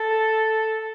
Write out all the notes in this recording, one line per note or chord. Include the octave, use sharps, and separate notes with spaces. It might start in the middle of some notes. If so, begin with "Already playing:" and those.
Already playing: A4